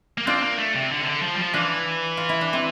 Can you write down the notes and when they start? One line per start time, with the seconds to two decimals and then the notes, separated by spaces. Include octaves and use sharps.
0.18 A#3
0.27 C4 D4 F4
0.43 A#3
0.58 A3
0.75 C3
0.91 D3
1.01 C3
1.06 D3
1.22 F3
1.34 G3
1.39 F3
1.54 E3 D4 F4
2.17 F4
2.29 E4
2.41 D4
2.53 C4 E4